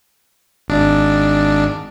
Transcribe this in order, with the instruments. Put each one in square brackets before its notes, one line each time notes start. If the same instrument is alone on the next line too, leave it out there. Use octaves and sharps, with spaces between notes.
[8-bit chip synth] G#1 D4